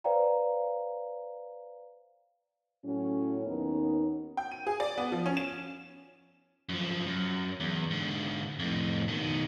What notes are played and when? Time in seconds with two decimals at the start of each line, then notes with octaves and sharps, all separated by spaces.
0.04 B4 C5 D5 F5 G5 A#5
2.85 A2 F#3 C#4
3.46 D#2 B3 C#4 D#4 A#4
4.37 G5
4.52 D#7
4.67 G#4
4.80 D5
4.98 B3
5.12 F3
5.26 C#4
5.37 E7
6.69 F#2 F3
7.07 F#2
7.60 E2
7.91 G#2 D3
8.59 F2 A2
9.08 B2 D#3